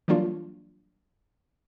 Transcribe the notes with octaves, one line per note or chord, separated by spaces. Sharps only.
E3 F#3 G3 A#3 D4 F4